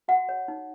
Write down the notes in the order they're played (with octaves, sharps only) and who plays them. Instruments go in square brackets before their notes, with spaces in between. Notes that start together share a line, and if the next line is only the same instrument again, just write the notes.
[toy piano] F#4 F#5
C#5
D#4